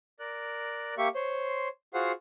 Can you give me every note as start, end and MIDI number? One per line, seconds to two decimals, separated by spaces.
0.19 0.94 70
0.19 0.94 74
0.19 0.94 90
0.98 1.08 58
0.98 1.08 67
0.98 1.08 76
0.98 1.08 85
1.15 1.68 72
1.15 1.68 73
1.15 1.68 84
1.94 2.12 65
1.94 2.12 66
1.94 2.12 68
1.94 2.12 72
1.94 2.12 77
1.94 2.12 78